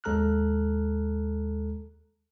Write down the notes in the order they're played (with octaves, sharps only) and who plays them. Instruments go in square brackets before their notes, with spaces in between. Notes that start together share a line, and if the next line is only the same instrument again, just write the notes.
[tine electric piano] D#2 G#3 A4 A#5 F6 F#6